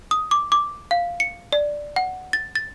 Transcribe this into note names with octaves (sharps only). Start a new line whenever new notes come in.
D#6
D6
D6
F5
C#7
D5
F#5
A6
A6